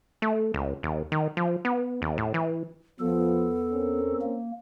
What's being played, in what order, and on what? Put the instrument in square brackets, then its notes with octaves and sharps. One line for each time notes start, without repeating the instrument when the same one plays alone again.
[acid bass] A3
C#2
D#2
D#3
F3
B3
D#2
A2
E3
[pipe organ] E2 A4 [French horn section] F3 [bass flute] B3
[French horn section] C4 C#4 A#4
[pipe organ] A#3